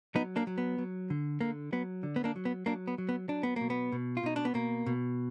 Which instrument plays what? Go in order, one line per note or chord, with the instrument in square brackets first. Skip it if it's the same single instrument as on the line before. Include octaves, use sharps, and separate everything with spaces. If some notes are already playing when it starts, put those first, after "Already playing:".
[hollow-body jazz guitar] F#3 B3 D#4
A#3 D4
F#3
B3
F#3
D3
D3 A#3
F#3 B3
D3
B3
A#3 D4
F#3
B3
F#3 A#3 D4
B3
F#3
B3
F#3 D4
B3
B2 A#3
B3
B2
F4
B2 D#4
D4
B3
B2 A#3
B2